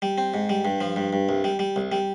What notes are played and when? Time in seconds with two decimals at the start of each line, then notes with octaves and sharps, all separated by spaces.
0.02 G3
0.18 C4
0.34 G#2
0.49 G3
0.65 G2
0.80 F3
0.96 G2
1.13 G2
1.29 C2
1.44 G3
1.59 G3
1.76 C2
1.92 G3